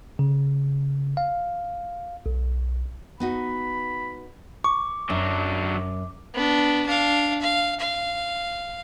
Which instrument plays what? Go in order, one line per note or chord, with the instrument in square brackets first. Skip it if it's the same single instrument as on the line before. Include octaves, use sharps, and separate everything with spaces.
[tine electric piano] C#3
F5
B1
[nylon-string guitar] B3 D#4 F#4 [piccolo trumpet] B5
[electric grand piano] C#6 [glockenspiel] D6
[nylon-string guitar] F#2 [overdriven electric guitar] F#3 D4
[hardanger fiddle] B3 D4
D4 F5
F5
F5